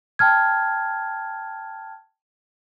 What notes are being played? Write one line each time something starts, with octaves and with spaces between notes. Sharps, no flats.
G5 A5 F6 G#6